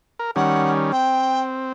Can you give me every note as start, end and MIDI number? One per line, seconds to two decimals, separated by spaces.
0.19 0.31 70
0.36 0.92 51
0.36 0.92 55
0.36 0.92 61
0.36 0.72 78
0.92 1.72 60
0.92 1.44 79